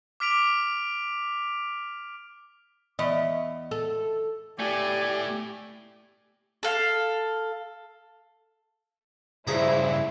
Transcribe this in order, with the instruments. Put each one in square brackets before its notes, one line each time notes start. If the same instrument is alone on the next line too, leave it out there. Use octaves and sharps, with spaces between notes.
[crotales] D6 F6 B6 D7 F7
[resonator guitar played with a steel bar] E2 [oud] D#5
[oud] A4
[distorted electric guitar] A2 A3 [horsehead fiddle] G4 [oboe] D5 [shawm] G#5
[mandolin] A4 F5
[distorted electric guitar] G2 C#3 [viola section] E4 [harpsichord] G#4 A#5 [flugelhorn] C5